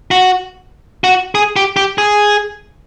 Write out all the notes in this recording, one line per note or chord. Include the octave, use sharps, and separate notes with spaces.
F#4
F#4
G#4
G4
G4
G#4